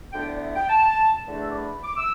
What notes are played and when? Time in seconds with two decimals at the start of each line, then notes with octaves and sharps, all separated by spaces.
0.12 D2 D3 B3 E4 G5
0.26 D5
0.41 E5
0.55 G5
0.69 A5
1.26 E2 D3 A3 D4
1.40 E6
1.49 D6
1.55 B5
1.83 D6
1.97 E6